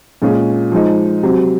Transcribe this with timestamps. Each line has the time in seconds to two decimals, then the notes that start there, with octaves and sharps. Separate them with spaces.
0.22 A#2 G#3 C#4 F4 G#4
0.72 F3 G#3 D#4
1.23 C3 F#3 C4